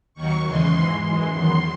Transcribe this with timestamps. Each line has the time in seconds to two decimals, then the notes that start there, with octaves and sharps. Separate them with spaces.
0.14 D#2 D#3 F#3 C#6
0.44 E2 C#3 E3 G#3 C6
0.74 G#2 E3 G#3
1.03 F#2 E3 G#3 C6
1.32 E2 D#3 F#3 C6